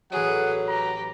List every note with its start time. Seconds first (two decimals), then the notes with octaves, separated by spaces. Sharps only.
0.12 A1 F#3 G#4 B4 F#5 D7
0.68 G4 B4 A#5